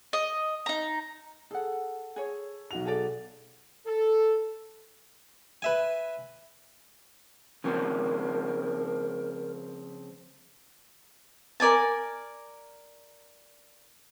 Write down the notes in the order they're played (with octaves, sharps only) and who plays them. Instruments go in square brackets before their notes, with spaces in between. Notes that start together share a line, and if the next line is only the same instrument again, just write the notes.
[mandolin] D#5
D#4 A#5
[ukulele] G#4 F#5 [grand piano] A4
[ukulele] G#4 C#5
[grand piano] B1 F#4 F7
[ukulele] G#4 A4 D5
[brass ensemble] A4
[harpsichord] B4 E5 G#5
[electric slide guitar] C#3 F3 C4 [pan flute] A#4
[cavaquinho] A#4 D5 G#5 A5